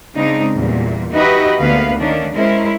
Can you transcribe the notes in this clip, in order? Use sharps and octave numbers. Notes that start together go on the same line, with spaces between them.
C#3 G#3 C4 D4 D#4
E2 A#2 G3
D#4 F#4 G4 B4 D#5 E5
D2 D3 A#3 B3 B4 F5
D#3 A3 A#3 C#4 D4
G#3 C#4 E4 A#4 C5